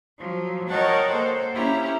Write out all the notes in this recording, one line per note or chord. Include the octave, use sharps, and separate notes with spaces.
F3 F#3
A#4 C#5 D#5 F#5 G5 A5
A#3 A4 C5
A#3 C#4 E4 G4 A#5